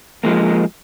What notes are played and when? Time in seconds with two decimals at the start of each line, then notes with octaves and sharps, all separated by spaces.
0.24 F3 G#3 A#3